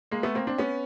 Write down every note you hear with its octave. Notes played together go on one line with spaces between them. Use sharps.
G#3 A#3
A3 B3
A#3 C4
C4 D4
B3 C#4